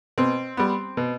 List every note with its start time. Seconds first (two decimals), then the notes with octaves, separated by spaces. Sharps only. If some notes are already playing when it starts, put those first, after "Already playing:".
0.18 B2 C4
0.57 G3 B3
0.97 B2